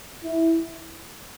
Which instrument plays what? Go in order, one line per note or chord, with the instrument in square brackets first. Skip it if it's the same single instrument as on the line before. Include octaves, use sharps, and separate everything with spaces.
[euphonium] E4